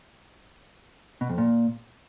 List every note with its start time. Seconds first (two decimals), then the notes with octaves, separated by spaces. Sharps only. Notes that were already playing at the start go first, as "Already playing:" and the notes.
1.21 B2
1.29 F2
1.38 A#2